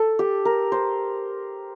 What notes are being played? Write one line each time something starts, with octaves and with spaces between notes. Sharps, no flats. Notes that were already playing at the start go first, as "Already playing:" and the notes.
Already playing: A4
G4
A#4
C5